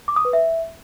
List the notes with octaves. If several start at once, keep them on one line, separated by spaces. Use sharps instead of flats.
D6
D#6
B4
E5